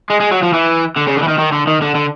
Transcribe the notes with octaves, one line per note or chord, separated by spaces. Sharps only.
G#3
G#3
F#3
F3
E3
D3
C#3
D3
E3
D#3
D#3
D3
D#3
D3
D3